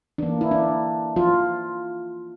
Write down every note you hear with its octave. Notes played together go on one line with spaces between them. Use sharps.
E3 A#3 D4
E4
D4
F3 F4